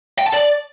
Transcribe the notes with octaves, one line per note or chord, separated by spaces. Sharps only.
G5
A5
D5